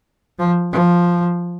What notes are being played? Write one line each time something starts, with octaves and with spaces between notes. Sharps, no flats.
F3
F3